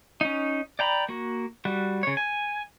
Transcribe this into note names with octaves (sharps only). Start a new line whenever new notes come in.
C#4 D#4
D5 G5 A#5 B5
A#3 F#4
G3 F#4
C#3 C#5
G#5